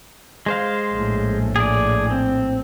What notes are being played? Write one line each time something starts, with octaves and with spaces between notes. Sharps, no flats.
G#3 C5 F5
A#1 A2
G#4 D5
C4